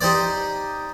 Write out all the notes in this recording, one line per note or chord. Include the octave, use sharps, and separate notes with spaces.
D#4 G4 C5 D5